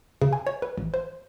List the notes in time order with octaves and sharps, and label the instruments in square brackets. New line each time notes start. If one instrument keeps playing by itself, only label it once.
[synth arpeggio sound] C#3
G#5
C#5
B4
A1
C5